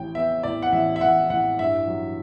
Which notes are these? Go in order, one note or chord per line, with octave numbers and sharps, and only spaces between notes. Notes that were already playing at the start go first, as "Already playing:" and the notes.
Already playing: A1 A2 G5
B3 E5
A2 D5
F#5
A1 E5
E5
A1 F#5
A2 F#5
G2 E5
F#3